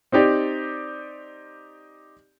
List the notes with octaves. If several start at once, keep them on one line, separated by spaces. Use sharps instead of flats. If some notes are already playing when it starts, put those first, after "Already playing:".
C4 D#4 G4 D5